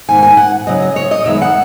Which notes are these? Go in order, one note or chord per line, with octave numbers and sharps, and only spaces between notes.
G#2 D#3 A#3 G#5
G#5
F#5
F#2 C#3 F#3 C#4 D#5
D#5
C#5
D#5
F#2 D#3 G#3 B3 E5
F#5